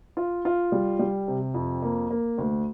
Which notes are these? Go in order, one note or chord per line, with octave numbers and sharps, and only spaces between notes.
F4
F4
G3
G3
C3
F2
A#3
A#3
D2